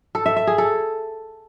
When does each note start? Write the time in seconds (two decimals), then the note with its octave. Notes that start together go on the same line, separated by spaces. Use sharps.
0.15 A4
0.26 E5
0.36 E5
0.47 G#4
0.58 A4